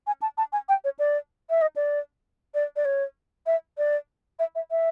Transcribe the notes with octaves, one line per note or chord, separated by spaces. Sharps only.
G#5
A5
A5
G#5
G5
C#5
D5
E5
D#5
D5
D5
D5
C#5
E5
D5
E5
E5
E5